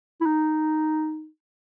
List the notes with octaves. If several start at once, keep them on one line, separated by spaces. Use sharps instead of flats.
E4
D#4